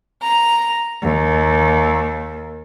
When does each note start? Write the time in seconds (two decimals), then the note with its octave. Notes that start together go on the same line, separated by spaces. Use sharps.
0.23 A#5
1.02 D#2